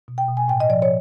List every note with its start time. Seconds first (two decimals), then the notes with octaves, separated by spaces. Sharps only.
0.08 B2
0.18 G5
0.28 B2
0.37 G#5
0.48 A2 G5
0.60 D#5
0.69 F3 D5
0.82 C#5